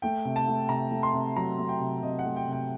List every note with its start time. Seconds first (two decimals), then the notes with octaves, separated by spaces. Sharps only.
0.02 A3 G5
0.25 C3
0.36 A5
0.48 A3
0.69 C3 A#5
0.91 A3
1.03 C6
1.14 C3
1.36 F#3 A#5
1.59 A3
1.69 G5
1.80 C3
2.03 C3 D#5
2.19 F#5
2.25 A3
2.36 G5
2.48 C3 G5